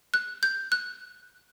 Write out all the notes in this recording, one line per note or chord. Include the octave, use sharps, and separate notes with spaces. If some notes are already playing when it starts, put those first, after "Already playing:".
F#6
G6
F#6